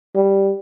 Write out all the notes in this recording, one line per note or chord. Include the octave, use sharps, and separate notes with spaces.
G3